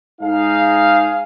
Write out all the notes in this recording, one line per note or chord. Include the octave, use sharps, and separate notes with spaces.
G#2 D#4 G#4 F5